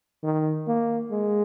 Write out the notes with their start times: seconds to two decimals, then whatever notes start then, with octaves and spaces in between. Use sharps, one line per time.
0.24 D#3
0.68 A#3
1.11 G#3